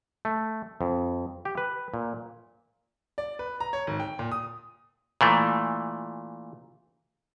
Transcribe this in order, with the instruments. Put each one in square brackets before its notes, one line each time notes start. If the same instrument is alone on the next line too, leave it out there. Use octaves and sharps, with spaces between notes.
[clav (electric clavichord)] A3
F2
G4
B4
A#2
[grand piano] D5
B4
A#5
C#5
G#1
G5
A#2
D#6
[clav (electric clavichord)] A#2 E3 A3